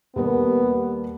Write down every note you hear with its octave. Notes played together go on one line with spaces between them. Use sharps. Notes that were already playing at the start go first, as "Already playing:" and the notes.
D#2 G3 B3 A#4